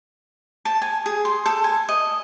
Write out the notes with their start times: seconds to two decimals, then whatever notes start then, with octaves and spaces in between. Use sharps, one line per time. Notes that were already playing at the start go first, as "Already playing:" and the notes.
0.65 A5
0.82 G#5
1.06 G#4
1.25 C6
1.46 A4
1.64 G#5
1.89 D#5